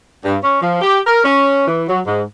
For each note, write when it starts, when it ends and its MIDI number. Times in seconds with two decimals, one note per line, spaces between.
0.24 0.37 43
0.43 0.59 61
0.61 0.81 53
0.81 1.00 67
1.07 1.21 70
1.24 1.66 61
1.67 1.83 52
1.88 2.01 54
2.06 2.22 44